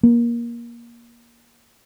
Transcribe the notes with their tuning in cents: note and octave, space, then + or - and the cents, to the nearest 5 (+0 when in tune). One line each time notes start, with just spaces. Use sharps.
A#3 +20